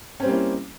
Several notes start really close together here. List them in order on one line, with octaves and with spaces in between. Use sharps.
C#4 C4 G3 A#3 E4